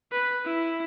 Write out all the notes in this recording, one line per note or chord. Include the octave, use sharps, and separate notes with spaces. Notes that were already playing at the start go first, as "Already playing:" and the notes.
B4
E4